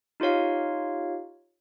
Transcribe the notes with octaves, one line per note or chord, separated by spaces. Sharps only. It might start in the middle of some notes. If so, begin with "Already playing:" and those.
D#4 F4 G4 C#5 F5